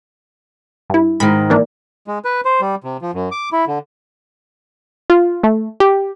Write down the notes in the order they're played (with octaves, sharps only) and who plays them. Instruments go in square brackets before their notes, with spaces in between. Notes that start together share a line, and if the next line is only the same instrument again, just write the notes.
[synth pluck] G2 E4
[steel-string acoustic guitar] G#2 D#3 [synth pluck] B5
[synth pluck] E3 A#3 D4
[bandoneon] G#3
B4
C5
G3
C3
F3
F#2
D6
E4
D3
[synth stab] F4
A3
G4